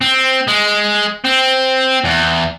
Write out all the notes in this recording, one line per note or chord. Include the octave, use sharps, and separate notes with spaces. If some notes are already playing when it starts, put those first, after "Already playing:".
C4
G#3
C4
E2